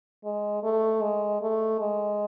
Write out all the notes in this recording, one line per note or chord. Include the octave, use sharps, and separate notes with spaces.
G#3
A3
G#3
A3
G#3